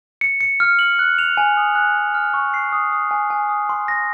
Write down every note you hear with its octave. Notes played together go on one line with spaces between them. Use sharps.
C#7
C#7
F6
F#7
F#6
F7
G#5
D#6
F#6
F#6
F6
C#6
C7
D#6
D#6
G#5
G#5
D#6
C6
A#6